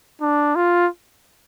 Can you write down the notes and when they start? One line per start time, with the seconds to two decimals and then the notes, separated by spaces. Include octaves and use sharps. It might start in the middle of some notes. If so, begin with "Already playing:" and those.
0.21 D4
0.56 F4